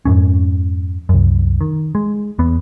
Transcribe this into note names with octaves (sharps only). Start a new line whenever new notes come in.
F2 G#2 C#4
C2 F#2
D#3
G#3
E2 B3